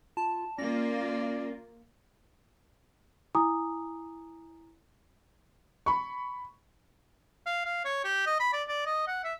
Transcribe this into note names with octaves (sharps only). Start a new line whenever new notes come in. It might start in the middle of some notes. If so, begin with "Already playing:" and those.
F4 A5
A#3 C#4 F4 D5 A#6
E4 G#5 A#5 D6 D#6
B5 C#6
F5
F5
C#5
G4
D#5
B5
D5
D5
D#5
F#5
E5